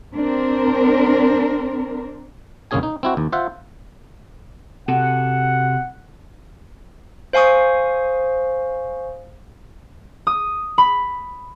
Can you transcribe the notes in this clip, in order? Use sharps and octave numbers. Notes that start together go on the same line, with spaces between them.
C4 D4 A#4
G1 C2 A#3 C#4 G#4 G#5
D#4
C4 E4 F#4
D#2
F4 C5 E5 F#5
C3 F#4 A4 F#5
C5 F5 G#5 C#6 D#6
D#6
B5